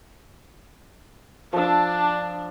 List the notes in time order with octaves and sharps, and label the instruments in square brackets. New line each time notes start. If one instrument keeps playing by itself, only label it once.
[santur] F3 E6 [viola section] D4